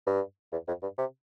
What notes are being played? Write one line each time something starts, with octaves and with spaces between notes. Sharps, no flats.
G2
E2
F2
G2
C3